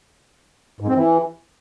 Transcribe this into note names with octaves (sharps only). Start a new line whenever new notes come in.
G#2
C4
E3